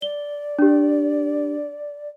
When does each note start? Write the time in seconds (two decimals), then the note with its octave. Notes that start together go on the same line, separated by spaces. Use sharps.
0.02 D5 G7
0.59 D4 G4